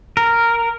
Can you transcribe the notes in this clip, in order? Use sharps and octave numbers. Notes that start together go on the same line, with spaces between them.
A#4